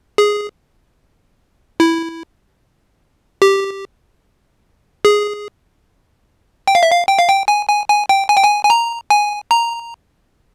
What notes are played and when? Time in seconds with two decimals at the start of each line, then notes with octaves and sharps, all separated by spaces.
0.18 G#4
1.80 E4
3.42 G4
5.05 G#4
6.67 G5
6.75 F5
6.83 E5
6.91 F5
7.08 G5
7.19 F5
7.29 G5
7.48 G#5
7.68 G#5
7.89 G#5
8.09 G5
8.29 G#5
8.37 G5
8.44 G#5
8.64 G#5
8.70 A#5
9.10 G#5
9.51 A#5